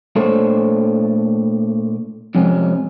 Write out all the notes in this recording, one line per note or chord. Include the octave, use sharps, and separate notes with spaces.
A#2 A3 D4 A4 C5 C#5
F2 G#2 C3 F3 C#4